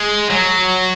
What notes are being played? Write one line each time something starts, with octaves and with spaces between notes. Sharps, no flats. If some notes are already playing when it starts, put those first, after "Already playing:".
Already playing: G#3
F#3